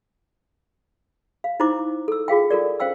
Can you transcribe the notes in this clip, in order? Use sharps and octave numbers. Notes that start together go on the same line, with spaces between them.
F5
D#4 E4 C5 A#5 D6
A4 E6
F4 G#4 F5 G5
F4 A4 A#4 D5
C#4 C5 F5 G5 E6